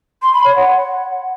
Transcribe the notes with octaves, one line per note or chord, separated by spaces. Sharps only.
C6
B5
C#5
F#5